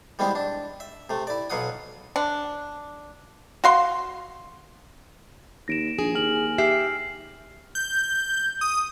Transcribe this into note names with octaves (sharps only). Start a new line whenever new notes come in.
E3 G3 G#3 B3 C4 E4
D4
E5
C3 A3
E4 D5
B1 B2 F#3 F5 F#5 D#6
D4
F#4 F5 C6
D#2 A#6 D7 E7
A#1 G#4
D#2 G#5 F6 F#7
G4 E5 F6 C7
G6
D#6